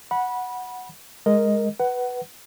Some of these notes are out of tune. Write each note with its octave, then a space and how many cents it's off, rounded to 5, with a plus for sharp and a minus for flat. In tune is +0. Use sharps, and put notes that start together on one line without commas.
F#5 -5 B5 -20
G#3 +0 A#4 +0 D#5 +0
B4 +0 F#5 +20